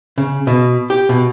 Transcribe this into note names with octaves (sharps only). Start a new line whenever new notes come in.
C#3
B2
G4
B2